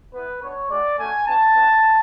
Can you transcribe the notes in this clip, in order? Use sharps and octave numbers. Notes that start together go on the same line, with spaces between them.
B3 E4 B4
B3 D4 F#4 C#5
G#3 D4 F#4 D5
A3 C#4 F#4 G#5
B3 D4 F#4 A5
B3 D4 F#4